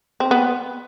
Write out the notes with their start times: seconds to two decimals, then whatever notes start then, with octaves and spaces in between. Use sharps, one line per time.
0.20 C4
0.31 B3